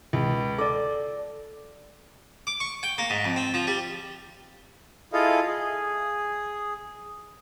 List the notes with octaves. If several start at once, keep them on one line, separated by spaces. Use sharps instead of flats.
C#2
A4 D5 D6
D6
C#6
G5
A#3
G#2
F2
C4
F3
G3
E4 F4 G#4 A4 D#5 F5
G#4